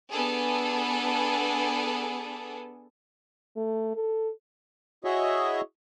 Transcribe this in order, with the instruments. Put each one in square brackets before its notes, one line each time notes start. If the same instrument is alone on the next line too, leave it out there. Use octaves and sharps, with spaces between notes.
[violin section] B3 D4 G#4 A4
[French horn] A3
A4
[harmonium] E4 F#4 G#4 C#5 D#5 E5